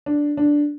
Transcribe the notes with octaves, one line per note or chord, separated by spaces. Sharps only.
D4
D4